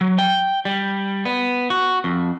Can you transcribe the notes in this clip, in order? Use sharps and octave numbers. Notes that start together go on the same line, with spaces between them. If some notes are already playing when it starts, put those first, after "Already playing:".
F#3
G5
G3
B3
F#4
F2